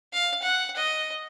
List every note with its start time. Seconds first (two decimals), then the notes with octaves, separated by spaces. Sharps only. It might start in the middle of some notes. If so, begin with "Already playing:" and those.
0.13 F5
0.42 F#5
0.77 D#5